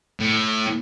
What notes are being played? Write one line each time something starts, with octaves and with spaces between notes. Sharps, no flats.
A2